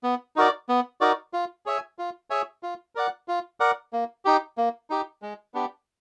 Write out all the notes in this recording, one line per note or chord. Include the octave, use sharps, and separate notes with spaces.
B3
D#4 F#4 A#4 D5
B3
D#4 F#4 A#4 D5
F4
G#4 C#5 E5 G#5
F4
G#4 C#5 E5 G#5
F4
A#4 D5 F#5
F4
A#4 D5 F#5
A#3
D#4 G4
A#3
D#4 G4
G#3
B3 D4 G4